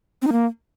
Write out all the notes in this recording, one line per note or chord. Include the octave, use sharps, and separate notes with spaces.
C4
D#4
A#3